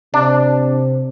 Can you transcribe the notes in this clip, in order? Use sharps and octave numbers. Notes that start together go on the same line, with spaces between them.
C3 D4